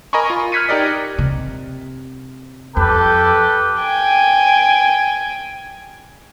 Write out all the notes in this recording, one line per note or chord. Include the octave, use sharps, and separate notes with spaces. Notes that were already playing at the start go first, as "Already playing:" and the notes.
A#4 D#5 G#5 A#5 B5 C#6
F4
F6 F#6 G#6 B6 C#7 D#7
D#4 G4 A#4 D5 D#5
C3
F2 G4 A4 B4
G5 G#5